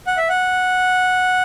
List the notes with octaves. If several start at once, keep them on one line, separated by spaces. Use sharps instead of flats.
F#5
E5
F#5